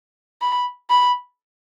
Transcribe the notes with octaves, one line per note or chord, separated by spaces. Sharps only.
B5
B5